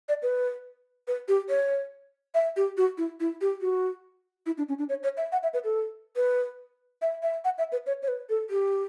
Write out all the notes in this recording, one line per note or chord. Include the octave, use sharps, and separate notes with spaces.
D5
B4
B4
G4
C#5
E5
G4
F#4
E4
E4
G4
F#4
E4
D4
C#4
D4
C#5
C#5
E5
F#5
E5
B4
A4
B4
E5
E5
F#5
E5
B4
C#5
C#5
B4
A4
G4